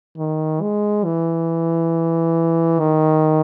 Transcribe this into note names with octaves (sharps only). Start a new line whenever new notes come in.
D#3
G#3
E3
D#3